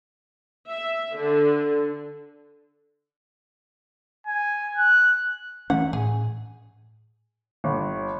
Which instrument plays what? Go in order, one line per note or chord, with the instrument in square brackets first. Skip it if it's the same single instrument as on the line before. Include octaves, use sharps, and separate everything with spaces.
[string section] E5
D3
[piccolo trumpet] G#5
F#6
[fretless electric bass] E3 A3 C#4 [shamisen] F#5
[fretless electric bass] A2 [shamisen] G#4
[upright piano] G1